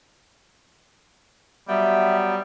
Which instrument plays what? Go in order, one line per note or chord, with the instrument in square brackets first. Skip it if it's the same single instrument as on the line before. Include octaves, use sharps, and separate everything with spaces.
[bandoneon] F#3 B3 G5 [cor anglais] G3 [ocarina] E5